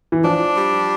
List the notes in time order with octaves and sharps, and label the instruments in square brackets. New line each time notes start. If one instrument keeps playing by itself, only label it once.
[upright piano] E3
[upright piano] F3 [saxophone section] D4
[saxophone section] G3